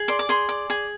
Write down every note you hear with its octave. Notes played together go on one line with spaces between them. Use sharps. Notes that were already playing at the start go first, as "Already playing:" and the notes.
Already playing: G#4
D5 C6
D6
G#4 C6
D5
G#4